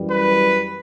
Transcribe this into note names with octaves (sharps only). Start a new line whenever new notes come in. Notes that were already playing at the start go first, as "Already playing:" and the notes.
Already playing: F#2 E3 G3
B4